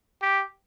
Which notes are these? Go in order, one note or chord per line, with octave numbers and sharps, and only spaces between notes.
G4